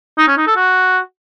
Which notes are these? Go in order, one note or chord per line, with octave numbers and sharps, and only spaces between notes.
D#4
C#4
D#4
A4
F#4